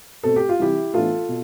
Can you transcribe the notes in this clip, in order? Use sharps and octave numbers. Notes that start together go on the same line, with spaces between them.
B2 A3 C4 A4
G4
F4
C3 E3 G3 E4 G4
A2 E3 B3 D4 F4 A4
B2